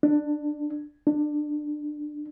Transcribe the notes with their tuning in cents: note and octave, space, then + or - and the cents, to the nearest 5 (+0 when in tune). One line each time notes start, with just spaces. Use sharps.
D4 +15
D4 +20